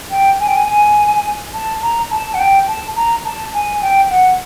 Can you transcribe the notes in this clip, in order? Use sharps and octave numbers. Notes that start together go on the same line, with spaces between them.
G5
G#5
G5
G#5
G#5
A5
A#5
A5
F#5
G5
A5
A#5
A5
G#5
G5
F#5